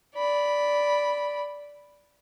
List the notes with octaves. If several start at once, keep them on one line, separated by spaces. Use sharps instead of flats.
D5 B5